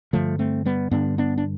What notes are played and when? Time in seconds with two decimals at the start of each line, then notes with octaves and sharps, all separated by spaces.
0.13 G2 D3 F3 A3
0.39 A3 C4
0.65 G3 B3
0.91 G2 D3 B3 D4
1.18 B3 D4
1.38 D4